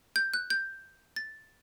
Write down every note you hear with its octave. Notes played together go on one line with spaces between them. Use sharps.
G6
F#6
G6
A6